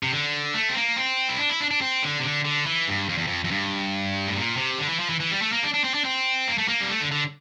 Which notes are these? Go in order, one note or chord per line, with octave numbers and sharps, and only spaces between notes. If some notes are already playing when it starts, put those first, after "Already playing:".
C3
D3
A3
C4
A#3
C4
E4
D4
E4
D4
D4
C4
D3
C3
D3
D3
E3
G2
F2
E2
F2
F2
G2
A2
A#2
C3
D3
E3
F3
E3
E3
G3
A3
A#3
D4
D4
C4
D4
C4
A#3
A3
A#3
G3
A3
D3
D3